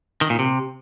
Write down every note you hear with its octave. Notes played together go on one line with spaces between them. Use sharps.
D#3
A#2
C3